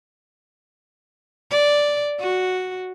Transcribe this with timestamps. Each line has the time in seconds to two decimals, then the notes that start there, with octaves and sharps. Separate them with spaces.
1.51 D5
2.20 F#4